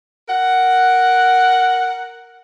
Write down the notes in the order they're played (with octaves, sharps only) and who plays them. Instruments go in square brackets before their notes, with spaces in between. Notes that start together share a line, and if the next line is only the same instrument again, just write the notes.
[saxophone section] A#4 F#5